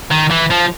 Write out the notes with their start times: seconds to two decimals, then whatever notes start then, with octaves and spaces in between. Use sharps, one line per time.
0.11 D#3
0.31 E3
0.51 F3